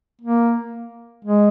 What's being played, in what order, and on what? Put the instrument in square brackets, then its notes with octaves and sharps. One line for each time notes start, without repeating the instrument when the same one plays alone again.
[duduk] A#3
G#3